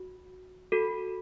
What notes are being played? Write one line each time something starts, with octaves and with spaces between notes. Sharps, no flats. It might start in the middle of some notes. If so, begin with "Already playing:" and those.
Already playing: F#4
F#4 A4